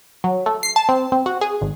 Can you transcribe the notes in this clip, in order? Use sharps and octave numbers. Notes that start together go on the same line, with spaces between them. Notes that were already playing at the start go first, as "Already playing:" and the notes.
F#3
A3
C7
A5
C4
C4
F#4
G#4
G#1